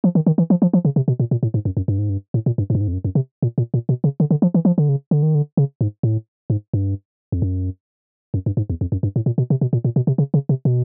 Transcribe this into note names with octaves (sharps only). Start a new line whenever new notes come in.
F3
D#3
D#3
E3
F3
F3
F3
C#3
C3
B2
A#2
A#2
A2
G#2
F#2
F#2
G2
G#2
G2
A2
A#2
G2
G#2
G2
G#2
F2
F#2
F#2
C3
A#2
A#2
A#2
B2
C#3
D3
D3
F3
E3
F3
D3
C#3
D3
D#3
D3
C#3
G#2
A2
G#2
G2
F2
F#2
F#2
G2
G#2
E2
F2
F#2
G2
A2
A#2
B2
C3
B2
A#2
A#2
B2
C3
C#3
C#3
C3
B2